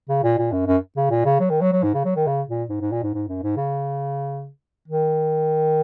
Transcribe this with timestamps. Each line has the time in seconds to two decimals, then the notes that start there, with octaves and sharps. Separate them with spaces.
0.09 C#3
0.23 A#2
0.39 A#2
0.52 F#2
0.67 F#2
0.96 C#3
1.10 A#2
1.25 C#3
1.40 F#3
1.50 D#3
1.61 F#3
1.73 F#3
1.83 G#2
1.94 C#3
2.05 F#3
2.16 D#3
2.27 C#3
2.49 A#2
2.70 G#2
2.81 G#2
2.92 A#2
3.03 G#2
3.14 G#2
3.28 F#2
3.43 G#2
3.57 C#3
4.88 D#3